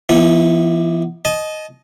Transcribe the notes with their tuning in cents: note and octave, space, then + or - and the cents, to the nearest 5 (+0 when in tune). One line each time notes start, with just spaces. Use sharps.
E3 +40 B3 +0 E4 -35
D#5 +0 A5 -35